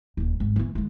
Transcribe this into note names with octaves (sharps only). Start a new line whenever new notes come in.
D#1 A#2
G#1
E3 B3
D#3 G#3